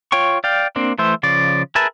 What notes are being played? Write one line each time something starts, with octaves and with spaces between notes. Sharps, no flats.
F4 C#5 G5 C#6
D5 F5 G5
A#3 C4 D4
E3 A3 C5 E5
C#3 F3 D5
G#4 A#4 B4 E5 A5